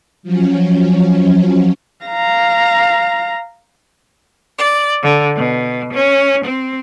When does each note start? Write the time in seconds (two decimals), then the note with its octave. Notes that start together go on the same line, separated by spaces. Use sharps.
0.23 F3 F#3 C#4
2.05 F5 A#5
4.59 D5
5.02 D3
5.36 B2
5.92 C#4
6.43 C4